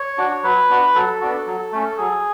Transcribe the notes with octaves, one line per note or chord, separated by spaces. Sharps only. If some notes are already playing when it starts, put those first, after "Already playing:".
Already playing: C#5
D4 F#4
F#3 B4
B3 D4 F#4
F#3 A4
B3 D4 F#4
F#3
A3 C#4
F#3 G#4